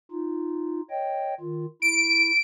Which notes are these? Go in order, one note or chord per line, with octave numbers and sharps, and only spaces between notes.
D#4 F4
C#5 D#5 G5
D#3 F4
E4 D7